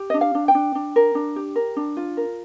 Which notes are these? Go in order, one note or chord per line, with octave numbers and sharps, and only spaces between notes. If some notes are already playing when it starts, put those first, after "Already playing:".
Already playing: G4
D4 D#5
F5
D4
G5
D4
D4
A#4
D4
G4
A#4
D4
F4
A#4